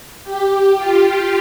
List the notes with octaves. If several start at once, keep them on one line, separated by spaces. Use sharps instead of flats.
G4
F4